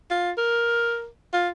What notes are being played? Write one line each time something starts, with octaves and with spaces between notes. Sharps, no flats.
F4
A#4
F4